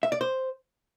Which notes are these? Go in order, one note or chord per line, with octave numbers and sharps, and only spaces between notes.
E5
D5
C5